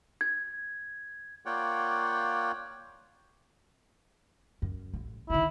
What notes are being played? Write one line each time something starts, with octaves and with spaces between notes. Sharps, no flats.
G#6
A#3 F4 C#5 D5 F#5 G5
F#2
A1
D3 D#3 E4